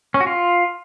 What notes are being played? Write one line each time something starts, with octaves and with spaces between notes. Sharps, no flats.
C#4
F#4
F4